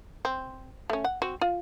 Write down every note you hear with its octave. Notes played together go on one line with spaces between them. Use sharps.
C4
A3 C#4
F#5
C4 F#4
F4